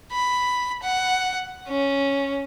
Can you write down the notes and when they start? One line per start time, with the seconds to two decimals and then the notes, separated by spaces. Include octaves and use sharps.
0.12 B5
0.83 F#5
1.68 C#4